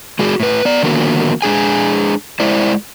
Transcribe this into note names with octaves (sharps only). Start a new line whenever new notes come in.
G#3 F#4 G#4
A2 B4
B3 D5
D3 D#3 F3 A#3 B3 F#4
G#3 D4 G#4 G#5
G#3 E4 C5 D5